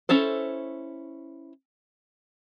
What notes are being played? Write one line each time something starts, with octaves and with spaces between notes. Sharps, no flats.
C#4 E4 A4 C5